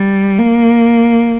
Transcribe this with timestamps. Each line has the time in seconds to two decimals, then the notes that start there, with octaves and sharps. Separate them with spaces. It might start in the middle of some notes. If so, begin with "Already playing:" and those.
Already playing: G3
0.39 A#3